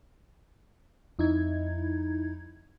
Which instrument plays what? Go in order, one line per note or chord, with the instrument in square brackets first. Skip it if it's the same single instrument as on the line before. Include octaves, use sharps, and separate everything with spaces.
[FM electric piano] F2 D#4 E4 G#6